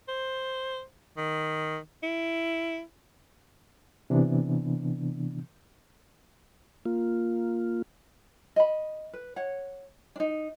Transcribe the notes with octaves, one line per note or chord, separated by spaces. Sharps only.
C5
D#3
E4
C3 E3 B3 D4
A#3 F4
D#5 B5
B4
C#5 F#5
D4 D#4